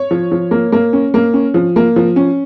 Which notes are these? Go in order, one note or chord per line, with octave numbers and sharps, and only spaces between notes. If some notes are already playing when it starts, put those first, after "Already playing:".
Already playing: C#5
F3
F3
A#3
A#3
C#4
A#3
C#4
F3
A#3
F3
C#4